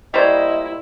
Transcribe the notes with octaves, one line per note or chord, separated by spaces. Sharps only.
G3 A#3 E4 C5 D5 D#5 C#6